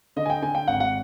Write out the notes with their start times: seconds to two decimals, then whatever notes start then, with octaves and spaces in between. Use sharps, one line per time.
0.16 D3 D#5
0.25 G#5
0.30 G5
0.42 D3 G#5
0.55 G5
0.68 G#1 F#5
0.80 F#5